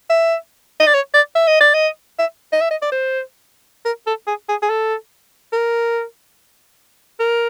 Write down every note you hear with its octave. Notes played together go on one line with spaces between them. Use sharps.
E5
D#5
D5
C#5
D5
E5
D#5
D5
D#5
E5
D#5
E5
D#5
D5
C5
A#4
A4
G#4
G#4
G#4
A4
A#4
A#4